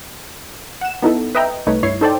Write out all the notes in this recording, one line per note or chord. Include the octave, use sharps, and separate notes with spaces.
F#5 E7
B3 D#4 E4 A4
B4 D#5 E5 G5 A#5
C2 A3 D#4 B4 C#5
G2 E4 C#5 C7
D#4 A4 C5 D5 G5